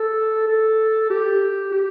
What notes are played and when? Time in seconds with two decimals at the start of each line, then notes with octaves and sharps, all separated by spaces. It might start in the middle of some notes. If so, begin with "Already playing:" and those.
Already playing: A4
0.47 A4
1.10 G4
1.72 G4